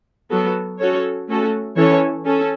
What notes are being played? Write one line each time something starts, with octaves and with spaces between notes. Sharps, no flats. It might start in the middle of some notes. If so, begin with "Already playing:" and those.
F#3 B3 F#4 A4
C#4 F#4 A4 C#5
A3 C#4 F#4 A4
E3 C#4 A4 C#5
C#4 A4